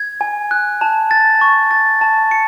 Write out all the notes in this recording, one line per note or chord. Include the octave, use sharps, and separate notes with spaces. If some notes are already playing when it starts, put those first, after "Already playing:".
Already playing: G#6
G#5
F#6
A5
A6
C#6
A6
A5
C#7